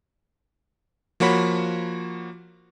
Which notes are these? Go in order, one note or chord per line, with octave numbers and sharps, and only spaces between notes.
F3 A#3 F#4 C#5 B5 B6